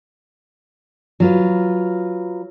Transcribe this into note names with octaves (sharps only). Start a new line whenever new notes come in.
F#3 F4 B4